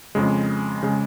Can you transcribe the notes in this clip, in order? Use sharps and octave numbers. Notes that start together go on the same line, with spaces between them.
F2 C#3 G#3
C#3 G#3